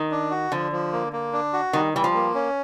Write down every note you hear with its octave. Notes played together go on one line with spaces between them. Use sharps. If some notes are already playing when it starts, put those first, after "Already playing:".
Already playing: D#3
D4
F#4
D3 F3
F3
A#3
A#3
D4
F#4
D#3 G3
E3 G3
F3
A#3
C#4